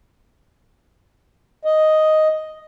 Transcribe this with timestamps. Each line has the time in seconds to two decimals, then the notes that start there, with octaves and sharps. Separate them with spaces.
1.65 D#5